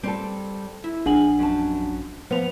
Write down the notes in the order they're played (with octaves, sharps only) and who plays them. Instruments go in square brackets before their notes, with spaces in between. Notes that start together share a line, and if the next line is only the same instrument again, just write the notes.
[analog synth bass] G3 [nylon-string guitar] C4 A4
[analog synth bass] E4
[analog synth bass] A#1 [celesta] D4 F#5 F#7 [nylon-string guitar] G#4
[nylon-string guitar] F#2 A5
[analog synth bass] F3 [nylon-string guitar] B3 [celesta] C5 F7